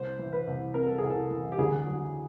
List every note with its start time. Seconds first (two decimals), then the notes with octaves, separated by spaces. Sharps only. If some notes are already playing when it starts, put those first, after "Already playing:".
Already playing: C2 C5
0.19 E3
0.33 B4
0.47 C2
0.74 C3 A#4
0.87 A4
0.98 C2 G#4
1.10 A4
1.30 E3
1.52 G4
1.58 D2 G#4
1.87 F#3